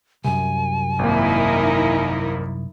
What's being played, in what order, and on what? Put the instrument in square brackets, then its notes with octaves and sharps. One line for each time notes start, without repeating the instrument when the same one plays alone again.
[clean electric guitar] C2 F#2 [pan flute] G#5
[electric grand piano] G#1 A#3 [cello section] D#4 E4 A#4